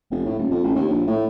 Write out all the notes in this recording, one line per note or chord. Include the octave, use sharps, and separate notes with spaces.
F1
A2
D#1
F2
A1
D#2
A#1
A2